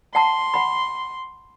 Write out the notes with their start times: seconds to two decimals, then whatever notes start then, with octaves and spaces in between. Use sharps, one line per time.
0.15 F#5 A5 A#5 C6
0.54 F#5 B5